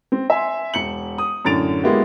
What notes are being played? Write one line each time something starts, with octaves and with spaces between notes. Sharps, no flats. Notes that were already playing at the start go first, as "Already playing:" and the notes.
C4
E5 G#5 C6
E1 C#7 F#7
D#6
F#2 A2 D3 A6 D7 F7
G#3 A#3 B3 E4 F#4 G4